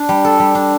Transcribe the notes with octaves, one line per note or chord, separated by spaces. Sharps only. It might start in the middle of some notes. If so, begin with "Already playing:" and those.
Already playing: D4
G3
A4
G3
D4